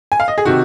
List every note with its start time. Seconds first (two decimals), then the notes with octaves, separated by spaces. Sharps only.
0.12 G#5
0.20 F5
0.28 D#5
0.38 G#4
0.45 C3 D#3 F#4